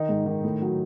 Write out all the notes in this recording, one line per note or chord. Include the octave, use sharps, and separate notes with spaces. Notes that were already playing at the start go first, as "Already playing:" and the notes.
Already playing: D#3 D#4
G#2
D#3
A2
F#3